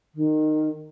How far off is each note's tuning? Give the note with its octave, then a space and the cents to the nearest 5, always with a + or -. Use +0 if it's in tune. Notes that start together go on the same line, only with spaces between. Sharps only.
D#3 -15